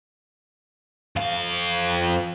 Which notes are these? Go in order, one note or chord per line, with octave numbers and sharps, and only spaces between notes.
F2 F5